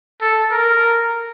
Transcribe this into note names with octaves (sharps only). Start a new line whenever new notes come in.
A4
A#4